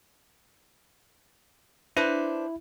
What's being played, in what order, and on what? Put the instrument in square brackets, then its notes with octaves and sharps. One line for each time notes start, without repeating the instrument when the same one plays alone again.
[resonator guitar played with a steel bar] D4 B4 C5 [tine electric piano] E4